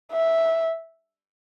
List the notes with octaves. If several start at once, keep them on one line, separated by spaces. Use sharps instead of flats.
E5